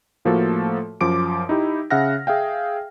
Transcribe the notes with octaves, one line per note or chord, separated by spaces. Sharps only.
A2 F3 A3 A#3 F#4 A4
F#2 F3 D6 D7
D#4 E4 G4
C#3 E5 F#5 F6 A#6
G#4 E5 F5 G5